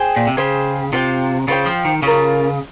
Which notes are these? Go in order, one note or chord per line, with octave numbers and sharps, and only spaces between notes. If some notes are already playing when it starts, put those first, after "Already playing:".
Already playing: G#4 C5 G5
A#2
C3
C#3 G#4 C5 G5
C3 F4 C5 G5
C#3 F4 C5 G5
F3
D#3
C#3 C#4 F4 A#4